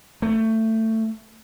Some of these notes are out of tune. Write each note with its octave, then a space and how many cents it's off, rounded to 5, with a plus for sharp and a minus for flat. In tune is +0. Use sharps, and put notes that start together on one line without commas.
A3 +20